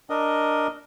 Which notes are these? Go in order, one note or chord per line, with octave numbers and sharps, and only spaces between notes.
D4 A#4 D#5